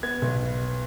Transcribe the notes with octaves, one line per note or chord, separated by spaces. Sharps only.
B3 G#6
B1